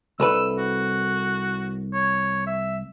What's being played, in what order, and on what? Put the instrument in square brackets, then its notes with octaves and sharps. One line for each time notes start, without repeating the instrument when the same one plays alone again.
[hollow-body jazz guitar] C2 A4 B4 [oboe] E6
[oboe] F#4
C#5
E5